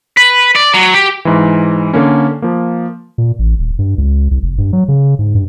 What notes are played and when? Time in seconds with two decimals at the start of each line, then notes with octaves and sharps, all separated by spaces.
0.17 B4
0.55 D5
0.74 F#3
0.94 G4
1.25 G#2 E3
1.93 D3 A#3 C#4
2.42 F3 A#3
3.18 A#2
3.39 A1
3.59 D#1
3.79 G2
3.98 C#2
4.31 C2
4.43 F1
4.58 G2
4.73 F#3
4.88 C#3
5.19 G#2
5.35 G2